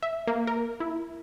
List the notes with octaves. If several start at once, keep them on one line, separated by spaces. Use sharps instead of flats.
E5
A#3
A#4
E4